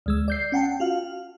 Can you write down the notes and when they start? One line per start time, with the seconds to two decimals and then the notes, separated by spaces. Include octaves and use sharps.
0.06 D2 G#3 E6
0.28 D5 G6 C7
0.52 C#4 F#5 G5 A5
0.80 F4 F#4 F5